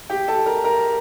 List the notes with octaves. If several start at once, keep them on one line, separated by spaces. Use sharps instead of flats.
G4 G5
A4 A5
A#4 A#5
A#4 A#5